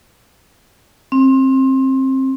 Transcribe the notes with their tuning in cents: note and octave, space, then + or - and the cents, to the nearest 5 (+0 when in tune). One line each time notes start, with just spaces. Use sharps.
C4 +25